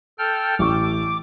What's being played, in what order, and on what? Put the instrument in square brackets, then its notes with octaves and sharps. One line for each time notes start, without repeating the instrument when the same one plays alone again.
[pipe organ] A4 G5 F6
[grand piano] A1 C#6 [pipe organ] D6